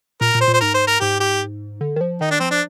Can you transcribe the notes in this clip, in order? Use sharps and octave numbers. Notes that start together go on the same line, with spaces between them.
A#2 A#4
A#2
C5
A#2
C5
G#2 A#4
C5
A#4
G#2 G4
G4
D3
D#3
F3
D#3 D#4
D4
F3 C4
D4